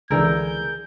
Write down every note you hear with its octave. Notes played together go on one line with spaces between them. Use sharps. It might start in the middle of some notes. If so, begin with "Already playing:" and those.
C#2 D3 E3 G#4 A#4 E6 G6